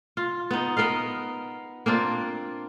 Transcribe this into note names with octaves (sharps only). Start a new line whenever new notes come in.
F4
B3 D#4
B3 A#4 D#5 F5
A#3 C4 D4 F4